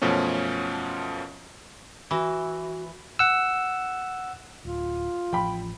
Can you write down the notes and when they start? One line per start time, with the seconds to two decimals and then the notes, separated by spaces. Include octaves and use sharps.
0.02 F#2 B2 F3 A3 C#4
2.11 E3 F#4
3.19 F#5 E6
4.65 D1 F4
5.33 A1 F3 G5 B5